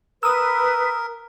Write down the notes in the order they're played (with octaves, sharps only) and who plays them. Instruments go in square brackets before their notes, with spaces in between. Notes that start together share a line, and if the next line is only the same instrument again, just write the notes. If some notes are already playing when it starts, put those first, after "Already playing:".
[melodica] A#4 [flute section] B4 [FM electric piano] D#6 E6